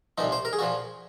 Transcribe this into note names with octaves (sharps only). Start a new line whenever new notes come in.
C2 A#2 F3 D#4
C5
A#4
G#4
A#2 F3 F#4